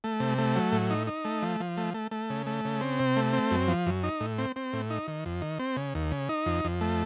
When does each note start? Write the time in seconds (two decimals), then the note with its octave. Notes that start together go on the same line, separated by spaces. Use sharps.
0.04 A3
0.20 C3
0.38 A3
0.55 F#3
0.72 A2
0.90 D#4
1.07 D#4
1.25 A3
1.43 F3
1.60 F3
1.77 A3
1.94 A3
2.11 A3
2.30 C#3
2.46 A3
2.65 C#3
2.81 C4
3.00 C3
3.16 A3
3.33 C4
3.51 F#2
3.68 F3
3.87 F#2
4.04 D#4
4.20 A2
4.38 C4
4.56 C4
4.73 A2
4.90 D#4
5.08 D#3
5.26 F2
5.42 D#3
5.59 C4
5.77 C#3
5.95 D#2
6.12 C#3
6.29 D#4
6.46 F2
6.65 F2
6.81 A3